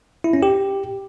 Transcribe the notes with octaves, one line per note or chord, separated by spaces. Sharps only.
E4
C#4
G4